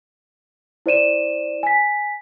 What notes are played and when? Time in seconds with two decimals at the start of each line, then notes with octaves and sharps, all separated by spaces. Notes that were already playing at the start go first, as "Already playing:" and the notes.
0.86 E4 C5 D5 D#7 E7
1.63 G#5 B6